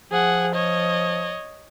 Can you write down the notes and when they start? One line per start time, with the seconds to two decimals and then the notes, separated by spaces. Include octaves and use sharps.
0.12 F3 G#4 F#5
0.55 C#5 D#5